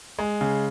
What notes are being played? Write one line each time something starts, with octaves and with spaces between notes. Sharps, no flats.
G#3
C#3